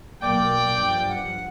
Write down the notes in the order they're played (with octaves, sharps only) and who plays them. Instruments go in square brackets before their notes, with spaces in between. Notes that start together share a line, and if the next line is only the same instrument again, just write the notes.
[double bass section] B1 A#3 [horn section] D5 G5 [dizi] D6
[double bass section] G2 F3
[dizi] F#5